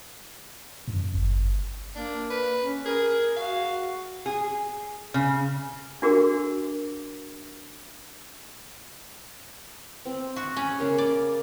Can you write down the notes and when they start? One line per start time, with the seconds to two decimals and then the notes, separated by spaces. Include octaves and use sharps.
0.88 F#2
1.14 G1
1.96 A#3 D4
2.30 B4
2.61 C#4
2.86 G#4 A#4
3.37 F#4 F5
4.26 G#4
5.14 C#3
6.02 D4 F#4 G#4 A#4
10.05 C4
10.36 F#4
10.57 C#4 B5
10.79 C#3 A#3 G#4
10.98 D5